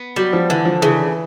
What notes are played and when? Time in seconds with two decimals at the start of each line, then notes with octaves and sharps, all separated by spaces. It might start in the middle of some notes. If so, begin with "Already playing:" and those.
Already playing: B3
0.16 F#3 G3
0.33 F3
0.49 D3 E3
0.65 F3
0.82 C#3 E3